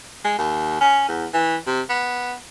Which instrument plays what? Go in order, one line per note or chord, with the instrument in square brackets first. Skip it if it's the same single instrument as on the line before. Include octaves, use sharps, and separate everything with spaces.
[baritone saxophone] G#3
D#2
C#4
E2
E3
C3
B3